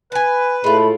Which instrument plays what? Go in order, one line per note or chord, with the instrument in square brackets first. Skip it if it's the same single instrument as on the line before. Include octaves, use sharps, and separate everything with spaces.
[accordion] B4 [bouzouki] G#5 A5
[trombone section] A2 A3 A4 [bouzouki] G#3 F4 [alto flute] B5